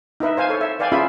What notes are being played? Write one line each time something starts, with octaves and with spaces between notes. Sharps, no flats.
D#4 E4 B4 E5
C5 F5 G#5
A4 C#5
E5
B4 D5 F5 G5 G#5
C#4 E4 F4 G#4 E5 B5